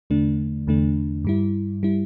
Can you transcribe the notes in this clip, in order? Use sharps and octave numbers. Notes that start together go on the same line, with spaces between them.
E2 D3 A3 D4
E2 D3 A3 D4
G2 G3 E4
G3 E4